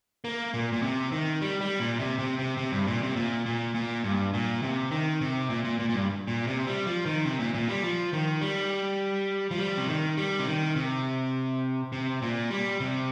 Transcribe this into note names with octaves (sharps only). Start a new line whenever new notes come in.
A#3
A#2
A#2
C3
D#3
G3
G3
A#2
C3
C3
C3
C3
G2
A#2
C3
A#2
A#2
A#2
G2
A#2
C3
D#3
C3
A#2
A#2
A#2
A#2
G2
A#2
C3
G3
F3
D#3
C3
A#2
A#2
G3
F3
D#3
G3
F3
G3
C3
D#3
G3
C3
D#3
C3
C3
A#2
G3
C3